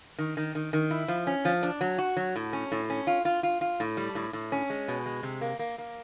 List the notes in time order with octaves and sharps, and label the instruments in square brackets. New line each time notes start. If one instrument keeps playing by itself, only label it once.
[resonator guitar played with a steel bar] D#3
D#3
D#3
D#3
E4
F3
C#4
F3
D4
F#3
F#4
F#3
A2
C#4
A2
C#4
F4
F4
F4
F4
A2
G3
A2
A2
C#4
G#3
B2
G#3
C3
A#3
A#3
A#3